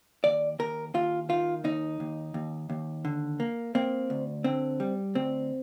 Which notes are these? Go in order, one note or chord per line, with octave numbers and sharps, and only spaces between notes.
D#2 D5
D#2 A#4
D#2 F4
D#3 F4
D#2 D#4
D#2
D#2
D#2
D3
A#3
A#3 C4
D2
D3 C4
G3
D2 C4